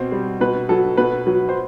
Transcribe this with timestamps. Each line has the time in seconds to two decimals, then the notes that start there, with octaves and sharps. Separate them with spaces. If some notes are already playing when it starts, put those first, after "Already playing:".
Already playing: B2 C4 C5
0.12 G3
0.41 B2 B4
0.69 F#3 A4
0.97 B2 B4
1.27 F#3
1.49 C5